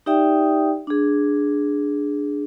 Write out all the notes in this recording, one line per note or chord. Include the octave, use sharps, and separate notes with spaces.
D#4 G4 D5 E5 G5 D#6
D4 G#4